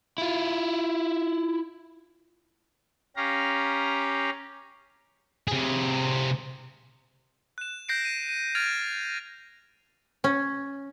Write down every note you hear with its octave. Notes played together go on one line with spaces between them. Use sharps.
E4 F4
C#4 G4 F5 A#5
C3 G#4
F#6 E7
F#6 G6 A#6 C7 D7
D#7
D#7
F6 G#6 A6 D7 F7
C#4